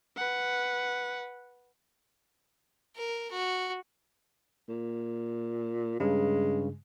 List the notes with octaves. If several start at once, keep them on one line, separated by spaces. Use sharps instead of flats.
B4 F#5
A#4
F#4
A#2
G2 C#3 G#3